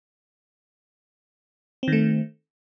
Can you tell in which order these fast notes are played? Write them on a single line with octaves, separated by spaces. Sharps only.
C4 D#3 A3